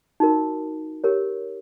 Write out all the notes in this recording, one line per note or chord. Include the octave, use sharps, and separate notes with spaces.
D#4 F#4 A#4
G4 A#4 C#5